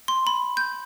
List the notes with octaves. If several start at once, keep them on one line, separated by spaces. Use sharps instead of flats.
C6
B5
G6